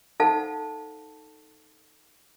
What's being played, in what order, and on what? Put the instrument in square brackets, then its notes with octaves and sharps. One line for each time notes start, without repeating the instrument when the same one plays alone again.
[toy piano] D#4 A4 C5 F5 F#5 A5